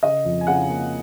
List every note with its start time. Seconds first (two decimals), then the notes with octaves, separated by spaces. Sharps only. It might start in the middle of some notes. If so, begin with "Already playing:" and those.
0.03 C#3 D#5
0.25 F2
0.41 G#5
0.47 C#3 F#5
0.69 A#3